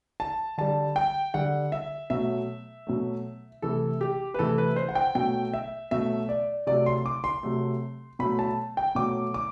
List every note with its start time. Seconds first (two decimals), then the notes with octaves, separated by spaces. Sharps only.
0.20 A5
0.58 D3 G3 A5
0.96 G5
1.34 D3 G3 F#5
1.72 E5
2.10 B2 F#3 A3 E5
2.87 B2 F#3 A3
3.62 C3 E3 A3 A4
4.01 G4
4.34 B4
4.39 C3 E3 A3 A4
4.58 B4
4.76 C5
4.89 F#5
4.95 G5
5.15 B2 F#3 A3 G5
5.53 E5
5.91 B2 F#3 A3 E5
6.29 D5
6.67 C3 F#3 A3 D5
6.86 C6
7.06 D6
7.24 C6
7.43 C3 F#3 A3
8.19 B2 F#3 A3 B5
8.39 A5
8.77 G5
8.95 B2 F#3 A3 D6
9.34 D6